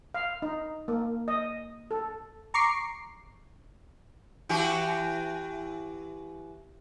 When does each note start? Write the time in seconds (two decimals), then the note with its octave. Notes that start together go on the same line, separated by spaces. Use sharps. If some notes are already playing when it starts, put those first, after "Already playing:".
0.14 F5
0.42 D#4
0.88 A#3
1.28 D#5
1.91 A4
2.54 A#5 C#6 D6 C7
4.49 E3 F#4 G4